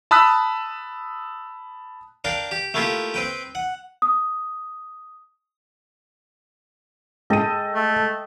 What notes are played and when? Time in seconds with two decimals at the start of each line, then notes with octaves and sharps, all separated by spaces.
0.11 A5 B5 D#6 E6 F#6 B6
2.24 D4 A#4 F5 G5
2.51 G4
2.74 A3 A#3 E4 F4 G4
3.14 C4 B4 G5
3.55 F#5
4.02 D#6
7.30 G#3 A4 D#5 G5 D#7
7.75 A3